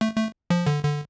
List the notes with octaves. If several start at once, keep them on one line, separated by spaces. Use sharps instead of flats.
A3
A3
F3
D3
D3